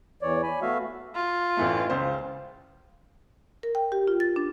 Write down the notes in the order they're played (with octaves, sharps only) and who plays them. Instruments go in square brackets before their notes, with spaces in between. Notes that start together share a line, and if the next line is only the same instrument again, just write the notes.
[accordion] E2 E3 C#5 D5
G#5 B5
A3 B3 F#4 E5 F5
[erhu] F4
[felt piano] A1 E3 A3
C#2 C#3 C5
[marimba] A#4
G5
G4
F4
A6
D4